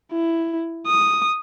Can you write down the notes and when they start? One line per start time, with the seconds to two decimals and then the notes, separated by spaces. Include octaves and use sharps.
0.12 E4
0.86 D#6